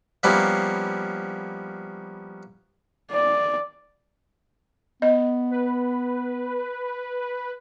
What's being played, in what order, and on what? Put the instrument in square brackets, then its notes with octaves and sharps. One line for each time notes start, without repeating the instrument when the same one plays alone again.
[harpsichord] F3 G3 A#3 B3 C#4 E4
[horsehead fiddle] D5
[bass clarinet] B3 [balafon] D#5
[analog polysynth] B4